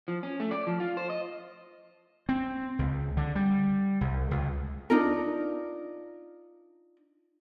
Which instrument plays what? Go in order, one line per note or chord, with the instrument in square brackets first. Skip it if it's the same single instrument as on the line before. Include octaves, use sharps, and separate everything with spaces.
[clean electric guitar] F3
C#4
A3
D5
F3
F4
C5
D#5
[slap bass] C4
C#2
D3
G3
C2
C#2
[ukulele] D4 D#4 F4 A#4